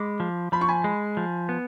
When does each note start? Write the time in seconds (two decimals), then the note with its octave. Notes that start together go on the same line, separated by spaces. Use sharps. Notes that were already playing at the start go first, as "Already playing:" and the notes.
Already playing: G#3 B5 D6
0.20 F3
0.52 F3 B5
0.61 C#6
0.68 G#5 B5
0.84 G#3
1.17 F3
1.49 B3